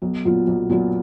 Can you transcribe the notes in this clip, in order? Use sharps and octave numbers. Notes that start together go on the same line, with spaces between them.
B1
A#2 F#3 B3 F4
B1
A#2 F#3 B3 F4